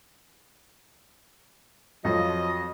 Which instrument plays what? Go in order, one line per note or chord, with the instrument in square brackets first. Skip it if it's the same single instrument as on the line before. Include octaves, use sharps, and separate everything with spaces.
[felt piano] F2 F#3 [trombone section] F3 [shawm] D#5